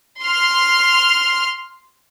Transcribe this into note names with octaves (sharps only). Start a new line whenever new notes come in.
C6 F6